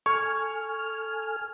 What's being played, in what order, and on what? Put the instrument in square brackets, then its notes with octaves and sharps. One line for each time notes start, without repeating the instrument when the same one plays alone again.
[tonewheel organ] A4 G#5 F6 [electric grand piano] C#6